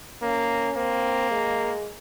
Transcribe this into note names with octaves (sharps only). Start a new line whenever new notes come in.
A#3 C#4
A#3 C4
G#3